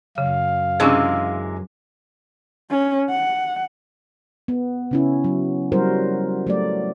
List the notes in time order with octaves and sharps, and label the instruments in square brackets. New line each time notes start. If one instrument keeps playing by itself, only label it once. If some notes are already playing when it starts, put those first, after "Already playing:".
[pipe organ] F#2 [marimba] C#3 [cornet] F5
[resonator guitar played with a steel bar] C3 E3 G#3 [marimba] C#4 D4 G#4
[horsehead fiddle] C#4
F#5
[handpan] B3
C#3 C#4 E4
F#3
F#3 G3 E4 F#4 A#4 C5
F#3 A3 D5